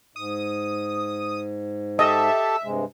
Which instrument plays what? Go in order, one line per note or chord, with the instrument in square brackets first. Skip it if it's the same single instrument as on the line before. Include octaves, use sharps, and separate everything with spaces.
[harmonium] G#2 [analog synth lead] D#6
[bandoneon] G4 A4 A5 [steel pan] D#5 [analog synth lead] E5
[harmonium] G2 C3 G#3